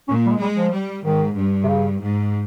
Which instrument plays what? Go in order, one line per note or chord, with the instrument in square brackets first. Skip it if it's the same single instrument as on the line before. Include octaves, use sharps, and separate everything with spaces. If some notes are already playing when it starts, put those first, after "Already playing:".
[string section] A#2 [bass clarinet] C#4
[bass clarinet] G3
G#3
[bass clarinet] G3 [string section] G#3
[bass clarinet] F3
[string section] G3
[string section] G#2 [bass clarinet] D#3
[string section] G2
[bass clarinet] C3
C#3
[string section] G#2